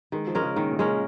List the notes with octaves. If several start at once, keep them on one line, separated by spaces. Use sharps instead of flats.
D#3 G#3
F3
G#3 C#4 A#4
C#3
A#2 D#3
A#2
G#3 C#4 A#4
C#3